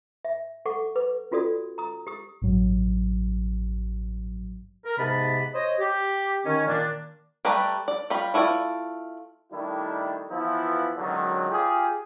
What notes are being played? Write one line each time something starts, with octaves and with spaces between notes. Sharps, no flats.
E5
A4 F#5 C#6 D6
B4 D6
C#4 F4 F#4 A4 D5 D#6
A#5 D#6
G4 D#6
A1 G2 F#3
A#4
G#2 C3 B3 A5 B5
C5 C#5 D#5
G4
D#3 C#4
A#2 D#3 A#3 D4
G3 A3 B4 D5 A#5
D5
G3 F4 B5
A3 E4 F4 A#4 D5
D#3 G3 A3 D4 E4
E3 F3 B3 E4 F4
C#2 D3 D#3 F#3
F4 G4 G#4